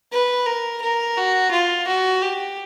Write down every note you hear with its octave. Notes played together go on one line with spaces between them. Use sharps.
B4
A#4
A#4
F#4
F4
F#4
G4